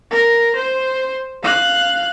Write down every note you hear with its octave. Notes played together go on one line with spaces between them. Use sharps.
A#4
C5
F5 F#6